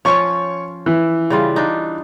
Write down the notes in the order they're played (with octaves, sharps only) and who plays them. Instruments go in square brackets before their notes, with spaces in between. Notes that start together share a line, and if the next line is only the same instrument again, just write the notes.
[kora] F3 C#4 F4 [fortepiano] C#5 C#6
[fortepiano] E3
[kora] C#3 G3 F4
D4 D#4